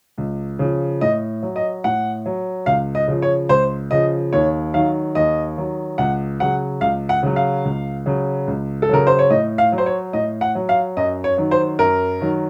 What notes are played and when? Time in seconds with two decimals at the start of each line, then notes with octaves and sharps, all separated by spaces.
0.18 C#2
0.59 C#3 F3
1.01 A2 D#5
1.43 F#3
1.56 D#5
1.84 A2 F#5
2.26 F#3
2.66 C#2 F5
2.95 D#5
3.08 C#3 F3
3.22 C#5
3.49 C#2 C5
3.91 C#3 F3 D#5
4.33 D#2 C#5
4.74 D#3 F#3 F5
5.15 D#2 D#5
5.57 D#3 F#3
5.98 C#2 F#5
6.40 C#3 F#3 F#5
6.81 C#2 F5
7.09 F#5
7.23 C#3 F#3
7.36 F5
7.65 C#2
8.06 C#3 F#3
8.47 C#2
8.82 A4
8.89 C#3 F#3 A#4
9.07 C5
9.19 C#5
9.30 A2 D#5
9.58 F5
9.72 F#3
9.78 C5
9.86 C#5
10.13 A2 D#5
10.41 F#5
10.55 F#3
10.69 F5
10.97 F#2 D#5
11.24 C#5
11.38 D#3 F#3
11.51 C5
11.79 F#2 A#4
12.20 D#3 F#3